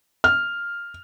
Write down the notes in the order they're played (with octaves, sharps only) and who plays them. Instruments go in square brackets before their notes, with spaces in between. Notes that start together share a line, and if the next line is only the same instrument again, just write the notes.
[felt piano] F6